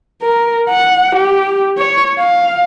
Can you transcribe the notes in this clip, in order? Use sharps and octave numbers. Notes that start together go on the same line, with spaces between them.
A#4
F#5
G4
C#5
F5